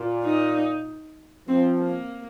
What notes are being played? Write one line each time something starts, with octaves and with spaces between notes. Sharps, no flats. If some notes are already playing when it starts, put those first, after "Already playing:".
Already playing: A#2
D#4
F3 C4
A#3